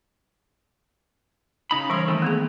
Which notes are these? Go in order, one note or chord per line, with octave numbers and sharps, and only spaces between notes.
C#3 D#4 B5
E3 G3 C#4 A#4 C6
D#3 A3 C4
A#3 B3 G#4